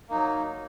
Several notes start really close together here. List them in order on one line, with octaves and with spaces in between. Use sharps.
A#3 D#4 F#3